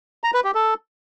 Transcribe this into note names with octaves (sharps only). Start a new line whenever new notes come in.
A#5
B4
G4
A4